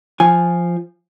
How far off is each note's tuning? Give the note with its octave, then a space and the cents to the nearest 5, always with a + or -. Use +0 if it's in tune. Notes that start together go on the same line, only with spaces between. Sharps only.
F3 +0 G#5 +0